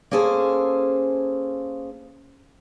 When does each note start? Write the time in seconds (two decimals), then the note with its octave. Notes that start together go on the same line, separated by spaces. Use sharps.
0.11 A#3 C#4 G#4 A4 C5